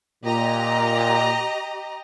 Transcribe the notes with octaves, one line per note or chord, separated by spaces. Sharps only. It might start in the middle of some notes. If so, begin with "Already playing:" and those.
A#2 G4 D#5 A#5